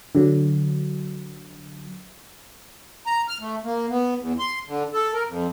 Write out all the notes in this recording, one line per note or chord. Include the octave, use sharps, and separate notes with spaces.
D3 F#3
A#5
F6
A3
A#3
B3
E2
C6
D3
A4
A#4
F2